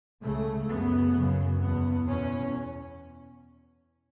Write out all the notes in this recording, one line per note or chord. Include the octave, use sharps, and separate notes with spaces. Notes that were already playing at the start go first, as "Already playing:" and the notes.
C#2 C#3 A3
F#2 C#3 B3
F#2 C#3
E2 B2 B3
E2 B2 C#4